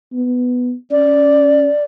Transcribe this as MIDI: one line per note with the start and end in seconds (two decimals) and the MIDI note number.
0.13 0.73 59
0.91 1.68 61
0.91 1.84 74